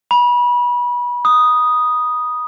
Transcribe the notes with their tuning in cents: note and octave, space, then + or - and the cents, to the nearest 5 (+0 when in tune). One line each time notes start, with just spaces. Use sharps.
B5 -25
D#6 -5